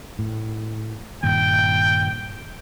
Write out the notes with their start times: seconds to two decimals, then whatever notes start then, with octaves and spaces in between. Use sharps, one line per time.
0.19 A2
1.23 G2 A#2 D#3 G5